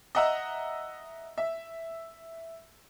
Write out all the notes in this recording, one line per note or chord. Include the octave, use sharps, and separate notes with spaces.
D#5 E5 F#5 A#5 E6
E5